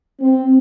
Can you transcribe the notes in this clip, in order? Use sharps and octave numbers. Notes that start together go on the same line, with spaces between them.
C4